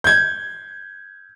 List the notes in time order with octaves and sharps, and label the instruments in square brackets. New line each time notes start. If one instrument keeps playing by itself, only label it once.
[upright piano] G6 G#6